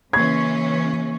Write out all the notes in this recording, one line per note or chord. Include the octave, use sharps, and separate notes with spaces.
C#3 E3 A#3 C#4 C#6 G#6 C7